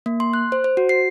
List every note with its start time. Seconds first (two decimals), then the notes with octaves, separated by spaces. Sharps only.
0.06 A#3
0.20 C6
0.34 F#6
0.52 C5
0.64 C5
0.77 F#4
0.89 C7